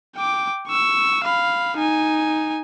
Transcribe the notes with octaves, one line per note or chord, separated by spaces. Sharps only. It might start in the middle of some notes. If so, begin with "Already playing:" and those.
G5 D6
C#6 E6
F5 B5
D#4 G#5